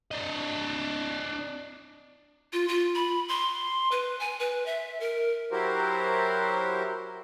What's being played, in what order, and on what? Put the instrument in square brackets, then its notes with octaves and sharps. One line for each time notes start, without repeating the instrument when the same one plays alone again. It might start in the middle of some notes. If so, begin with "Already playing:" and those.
[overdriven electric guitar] D4 D#5
[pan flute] F4
F4
B5
C6
B4
G#5
B4
E5
A#4
[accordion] F#3 E4 F#4 G4 A#4 C5